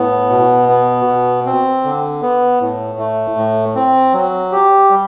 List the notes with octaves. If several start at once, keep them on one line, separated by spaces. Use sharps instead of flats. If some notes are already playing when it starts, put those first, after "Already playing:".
Already playing: A2 B3
B2
B3
B2
C4
D3
B3
A2
A3
A2
C4
F#3
G4
G3